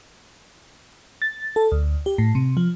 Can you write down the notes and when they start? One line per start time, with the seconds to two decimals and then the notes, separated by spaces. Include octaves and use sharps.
1.22 A6
1.56 A4
1.72 D2
2.06 G4
2.18 A2
2.35 C3
2.57 F3